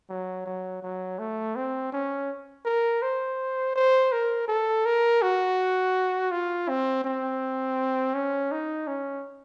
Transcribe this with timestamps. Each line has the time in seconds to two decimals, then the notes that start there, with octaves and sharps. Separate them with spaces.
0.09 F#3
0.46 F#3
0.82 F#3
1.19 A3
1.56 C4
1.92 C#4
2.65 A#4
3.02 C5
3.76 C5
4.12 A#4
4.48 A4
4.85 A#4
5.22 F#4
6.31 F4
6.69 C4
7.04 C4
8.14 C#4
8.51 D#4
8.87 C#4